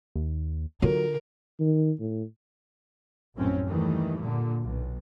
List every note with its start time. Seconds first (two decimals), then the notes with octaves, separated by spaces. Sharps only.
0.15 D#2
0.82 D3 F#3 F4 A#4
1.60 D#3
2.00 A2
3.36 A#1 F#2 A2 C4 C#4
3.65 D#2 D#3 E3 G3 A3
4.19 A#2 D3
4.61 B1